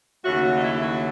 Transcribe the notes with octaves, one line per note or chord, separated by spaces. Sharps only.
D#2 C#3 F#3 A3 F#4
F#4
D#4
E4
F#4